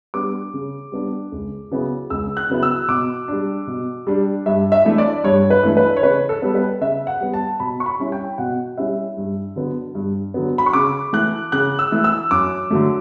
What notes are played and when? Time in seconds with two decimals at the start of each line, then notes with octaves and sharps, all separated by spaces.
0.14 G3 B3 D4 D6
0.54 C#3
0.92 G3 B3 D4
1.32 C#2
1.71 C#3 F#3 B3 E4
2.10 C#2 E6
2.37 F#6
2.49 C#3 F#3 B3 E4
2.63 E6
2.88 B2 D6
3.28 G3 D4
3.67 B2
4.07 G3 D4
4.46 G2 E5
4.72 E5
4.85 E3 A3 D4
4.98 D5
5.24 G2 C#5
5.50 B4
5.63 E3 A3 D4
5.77 B4
5.97 C#5
6.03 C#3 B4
6.29 A4
6.42 G3 B3
6.55 B4
6.81 C#3 E5
7.07 F#5
7.21 G3 B3
7.33 A5
7.60 B2 B5
7.80 C#6
7.86 B5
7.99 G3 C#4 E4
8.12 G5
8.38 B2 F#5
8.78 G3 C#4 E4 E5
9.17 G2
9.56 D3 F#3 B3
9.95 G2
10.34 D3 F#3 B3
10.58 B5
10.66 C#6
10.73 C#3 D6
11.13 E3 A3 F#6
11.52 C#3 F#6
11.79 E6
11.92 E3 A3
12.04 E6
12.31 F#2 D6
12.71 D3 F#3 A3